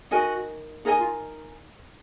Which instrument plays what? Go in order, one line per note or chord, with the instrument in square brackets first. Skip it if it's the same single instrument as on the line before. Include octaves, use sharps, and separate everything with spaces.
[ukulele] D#4 A#4 D#5 G#5 [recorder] F#4
[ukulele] D#4 A#4 D#5 G#5 [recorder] G#4
[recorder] F4